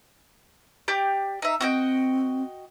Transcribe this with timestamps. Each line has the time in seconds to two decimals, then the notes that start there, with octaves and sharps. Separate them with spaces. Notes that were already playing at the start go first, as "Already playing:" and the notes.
0.88 G4 D5 G6
1.42 D#4 E5
1.61 C4 F#4 D#5 G5